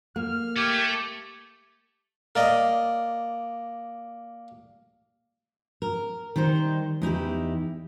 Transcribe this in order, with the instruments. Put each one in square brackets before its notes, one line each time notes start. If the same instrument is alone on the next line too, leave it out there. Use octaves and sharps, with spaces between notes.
[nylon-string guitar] A#3 [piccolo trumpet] F6
[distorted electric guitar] A3 [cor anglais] G4 [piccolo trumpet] G#6
[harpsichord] A#3 D5 D#5
[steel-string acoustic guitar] A#4
D#3 G3 D#4 C5
E2 D#4 E4 G4